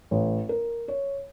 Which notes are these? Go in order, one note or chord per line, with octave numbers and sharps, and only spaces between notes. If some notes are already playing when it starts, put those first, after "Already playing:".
A1
A#4
C#5